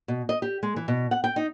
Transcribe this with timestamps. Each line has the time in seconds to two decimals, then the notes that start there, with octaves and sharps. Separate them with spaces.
0.08 B2
0.29 D#5
0.42 G4
0.63 G#3
0.76 E3
0.88 B2
1.11 F#5
1.24 G5
1.36 D#4